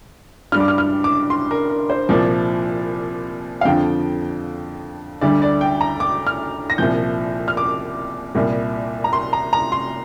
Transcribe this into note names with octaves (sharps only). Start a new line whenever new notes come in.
G2 G3 F6
D6
F6
F6
D6
C6
A#4
A#4
C5
C2 A#2 F3 D5
F5
F2 D3 F3 G5
D2 D3 G3 D5
D5
G5
A#5
D6
F6
A#6
C2 A#2 F3 G6
F6
D6
C2 A#2 G3
A#5
C6
A#5
A#5
C6